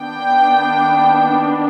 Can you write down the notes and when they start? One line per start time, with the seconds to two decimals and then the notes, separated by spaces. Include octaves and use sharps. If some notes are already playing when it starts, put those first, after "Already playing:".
Already playing: D#3 B3 D4 G5